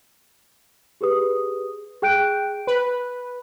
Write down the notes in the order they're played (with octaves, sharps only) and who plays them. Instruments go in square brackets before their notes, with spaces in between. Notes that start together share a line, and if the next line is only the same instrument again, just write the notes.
[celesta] G4 G#4 B4 D#6
G#4 G5 F#6 G6 D7
[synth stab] B4